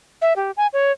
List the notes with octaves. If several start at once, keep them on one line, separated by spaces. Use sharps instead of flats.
E5
G4
G#5
C#5